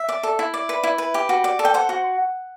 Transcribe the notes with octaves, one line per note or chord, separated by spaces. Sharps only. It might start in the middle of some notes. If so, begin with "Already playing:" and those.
Already playing: E5
D5
A4
E4
D5
B4
E4
B4
G4
F#4
D5
A4
G5
C5 F#5
F#4